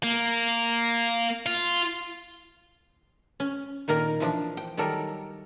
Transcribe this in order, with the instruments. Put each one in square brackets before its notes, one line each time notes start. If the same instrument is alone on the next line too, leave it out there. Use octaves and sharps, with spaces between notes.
[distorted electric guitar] A#3
F4
[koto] C#4
A#2 D#3 A#3 A#4
E3 F3 D4
G5
D#3 F#3 G3 A4 A#4